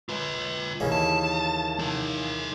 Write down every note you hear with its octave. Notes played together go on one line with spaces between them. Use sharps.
F4 B4
D#2 C#3 E3
A5
D#4 A4